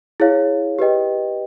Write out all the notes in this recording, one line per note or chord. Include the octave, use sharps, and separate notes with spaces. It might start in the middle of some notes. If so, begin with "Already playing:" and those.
E4 G#4 C#5 F5
G4 B4 D#5 G5